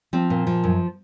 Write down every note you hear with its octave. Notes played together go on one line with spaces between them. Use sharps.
F3 C4
A#2
F3
F#2